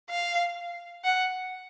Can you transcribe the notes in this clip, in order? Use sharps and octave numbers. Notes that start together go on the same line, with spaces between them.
F5
F#5